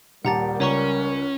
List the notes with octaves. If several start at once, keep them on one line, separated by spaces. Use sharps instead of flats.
D#1 G3 G4 A#4 F#5 A5 A#5 A6
C#2 C#4 C#5 A#5 C#6